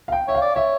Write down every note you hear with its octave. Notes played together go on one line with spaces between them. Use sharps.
F5
G5
C#5 E5
F5
D5
C#5 E5